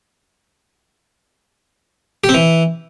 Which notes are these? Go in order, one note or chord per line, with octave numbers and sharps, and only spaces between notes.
G4
C4
E3